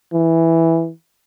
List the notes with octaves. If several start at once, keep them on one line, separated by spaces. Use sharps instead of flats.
E3